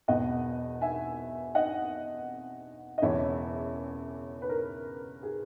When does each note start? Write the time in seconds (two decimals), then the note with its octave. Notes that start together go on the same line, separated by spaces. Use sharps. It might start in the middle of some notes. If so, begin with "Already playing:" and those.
0.08 E1 E2 B2 D#5 F#5
0.81 E5 G#5
1.55 D#5 F#5
2.98 D#5
3.02 E1 E2 C#3 E3 C#5 E5
4.42 B4
4.49 A#4
5.23 G#4